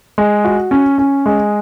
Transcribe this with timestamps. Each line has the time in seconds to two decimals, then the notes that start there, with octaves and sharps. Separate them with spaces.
0.18 G#3
0.44 F#4
0.71 C#4
0.98 C#4
1.26 G#3